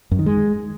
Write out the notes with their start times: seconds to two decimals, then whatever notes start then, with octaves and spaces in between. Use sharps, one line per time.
0.11 F#2
0.19 D#3
0.26 G#3